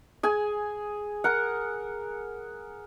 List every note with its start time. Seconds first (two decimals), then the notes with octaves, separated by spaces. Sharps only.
0.23 G#4 G#5
1.24 A#4 F#5